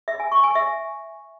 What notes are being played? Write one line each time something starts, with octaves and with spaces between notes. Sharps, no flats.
E5
G#5
C#6
G#5
E5